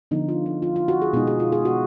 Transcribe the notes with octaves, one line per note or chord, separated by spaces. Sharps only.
D3 F3 B3 D#4
F4
D#4
F4
F4
F#4
G#4
B2 G#3 D#4 G#4
G#4
F4
G#4
F#4